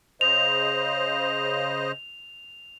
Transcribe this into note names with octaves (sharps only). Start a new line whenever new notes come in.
C#3 C5 D#5 F7